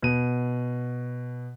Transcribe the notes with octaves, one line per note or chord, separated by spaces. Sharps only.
B2 D#7